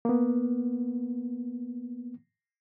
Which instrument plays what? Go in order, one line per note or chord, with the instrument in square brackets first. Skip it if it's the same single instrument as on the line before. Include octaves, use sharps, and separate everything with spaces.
[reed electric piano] A#3 B3